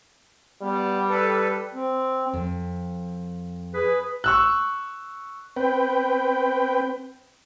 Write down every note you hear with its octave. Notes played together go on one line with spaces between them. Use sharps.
G3 B3
A4 B4
C4
F2
G#4 B4
C#6 E6 F#6
C4 B4 G5